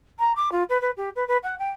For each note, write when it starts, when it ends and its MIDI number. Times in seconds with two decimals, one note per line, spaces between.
0.19 0.33 82
0.36 0.52 86
0.52 0.63 65
0.69 0.80 71
0.82 0.91 71
0.97 1.10 67
1.16 1.27 71
1.28 1.37 71
1.44 1.58 78
1.59 1.69 79